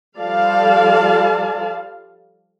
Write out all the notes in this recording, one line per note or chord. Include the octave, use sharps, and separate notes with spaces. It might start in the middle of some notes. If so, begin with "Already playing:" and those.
F3 G3 A4 D5 F5 A5